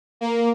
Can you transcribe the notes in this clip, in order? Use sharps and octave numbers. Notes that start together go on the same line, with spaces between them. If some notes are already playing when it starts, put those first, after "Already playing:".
A#3